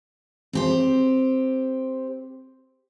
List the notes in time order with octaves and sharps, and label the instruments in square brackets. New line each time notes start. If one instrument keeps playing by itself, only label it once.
[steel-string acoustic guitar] C4 G4 C5